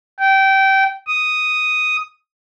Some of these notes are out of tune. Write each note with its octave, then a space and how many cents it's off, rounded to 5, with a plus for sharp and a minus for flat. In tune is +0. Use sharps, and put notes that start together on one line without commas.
G5 -20
D#6 +0